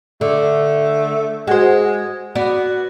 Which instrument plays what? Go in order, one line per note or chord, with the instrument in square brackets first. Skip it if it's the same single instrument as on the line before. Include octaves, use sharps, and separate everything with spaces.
[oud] D3 [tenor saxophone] A3
[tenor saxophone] G#3 [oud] F#4 C5
[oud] B3 D5 [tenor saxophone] F#4